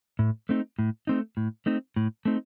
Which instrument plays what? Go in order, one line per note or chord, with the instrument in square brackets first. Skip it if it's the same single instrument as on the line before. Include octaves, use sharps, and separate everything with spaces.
[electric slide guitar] A2
A3 C4 D#4
A2
A3 C4 D#4
A2
A3 C4 D#4
A2
A3 C4 D#4